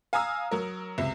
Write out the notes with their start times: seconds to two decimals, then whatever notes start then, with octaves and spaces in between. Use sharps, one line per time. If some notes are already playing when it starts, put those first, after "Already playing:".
0.13 F5 G#5 A#5 D#6 E6
0.51 F#3 A#4
0.98 C#2 C3 E5